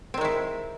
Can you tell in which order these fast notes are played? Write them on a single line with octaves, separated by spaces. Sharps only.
C4 D#3 G#3 E4